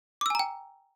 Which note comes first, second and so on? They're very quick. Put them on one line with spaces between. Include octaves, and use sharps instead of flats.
D6 E6 G#5 A#5 G5